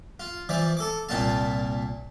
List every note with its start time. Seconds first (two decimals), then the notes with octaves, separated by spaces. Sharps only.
0.20 F4
0.49 E3 F3 D5
0.77 A4 D6
1.09 C2 A#2 F4 A5